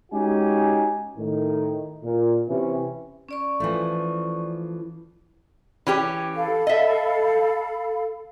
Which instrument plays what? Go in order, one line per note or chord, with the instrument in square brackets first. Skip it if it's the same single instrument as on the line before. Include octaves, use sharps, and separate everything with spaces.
[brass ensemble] G#3 C#4 D#4 F#4 G4 G#5
A2 D#3
A#2
C3 E3 C#4
[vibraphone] C#4 D5 C#6
[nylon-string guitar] E3 F3 A3
[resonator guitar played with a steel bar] E3 C#4 G4
[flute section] A4 F5 B5
[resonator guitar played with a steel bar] D#5 E5